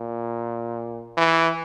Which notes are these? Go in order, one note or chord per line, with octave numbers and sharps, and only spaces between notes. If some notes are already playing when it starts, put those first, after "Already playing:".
Already playing: A#2
E3